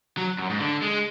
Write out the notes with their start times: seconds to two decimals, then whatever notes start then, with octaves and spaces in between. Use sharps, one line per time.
0.17 F#3
0.38 F#2
0.50 G#2
0.60 D3
0.82 G#3